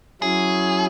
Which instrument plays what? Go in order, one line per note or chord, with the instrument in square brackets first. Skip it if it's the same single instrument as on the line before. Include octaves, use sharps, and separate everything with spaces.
[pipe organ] F#3 C#4 E4 [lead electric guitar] G#4